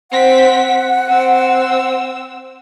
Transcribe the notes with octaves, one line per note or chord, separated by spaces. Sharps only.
C4 F#5 B6
C4 E6